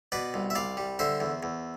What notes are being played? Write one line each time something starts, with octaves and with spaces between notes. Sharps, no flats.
B2 B4 D5
C2
E5
C2 D5 F5
G3
D3 C5 E5
E2
E2